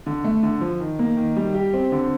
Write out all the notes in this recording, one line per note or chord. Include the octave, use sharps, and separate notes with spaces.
D3
A3
D3
F3
D#3
A#3
D#3
G3
G4
C4
D3